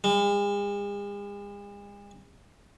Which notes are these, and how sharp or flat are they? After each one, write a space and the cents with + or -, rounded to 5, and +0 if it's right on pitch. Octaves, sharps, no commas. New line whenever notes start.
G#3 -45